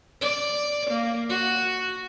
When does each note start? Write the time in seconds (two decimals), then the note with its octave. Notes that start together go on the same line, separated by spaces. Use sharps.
0.21 D5
0.91 A#3
1.30 F#4